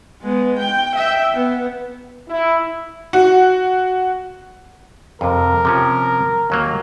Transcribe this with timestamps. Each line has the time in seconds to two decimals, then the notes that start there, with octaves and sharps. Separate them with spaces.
0.22 G#3 B3
0.59 G5
0.96 E5 G5
1.33 B3
2.29 E4
3.13 F#4
5.21 F2 C3 A#4
5.65 C3 F3 C#4
6.50 D#2 F#3 A#3